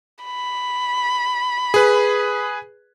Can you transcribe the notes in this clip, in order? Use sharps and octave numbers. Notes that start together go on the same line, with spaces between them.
B5
G#4 B4